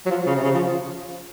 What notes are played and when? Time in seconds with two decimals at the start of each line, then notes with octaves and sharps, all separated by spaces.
0.06 F#3
0.11 F3
0.27 C#3
0.36 C3
0.44 C#3
0.54 F3